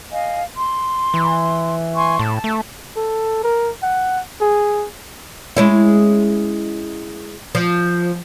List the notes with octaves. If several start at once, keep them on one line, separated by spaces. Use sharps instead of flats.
D#5 F5 G#5
C6
E3
G#5 C6 C#6
A2 A5
A3
A4
A#4
F#5
G#4
G#3 C#4 E4
F3